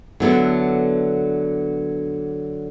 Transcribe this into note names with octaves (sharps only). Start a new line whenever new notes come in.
D3 F#3 B3 E4 A4